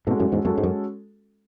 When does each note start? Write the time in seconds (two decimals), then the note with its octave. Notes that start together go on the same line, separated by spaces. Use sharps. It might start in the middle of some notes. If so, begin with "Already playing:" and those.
0.07 G#2 B2 G#3 C#4 F#4 A4
0.20 F#2 A2
0.32 E2 G#2
0.45 F#2 G#3 C#4 F#4 A4
0.58 G#2
0.64 F#2